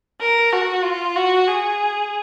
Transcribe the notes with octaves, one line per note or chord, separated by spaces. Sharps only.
A#4
F#4
F4
F#4
G#4